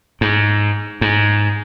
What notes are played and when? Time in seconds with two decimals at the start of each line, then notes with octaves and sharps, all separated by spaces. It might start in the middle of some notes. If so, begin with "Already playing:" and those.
0.21 G#2
1.01 G#2